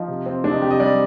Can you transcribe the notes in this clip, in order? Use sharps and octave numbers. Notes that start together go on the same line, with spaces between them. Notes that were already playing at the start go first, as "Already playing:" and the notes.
Already playing: F3 D#4
C3
C4
C3 D4
D#4
C3 G4
D#5
G3 D5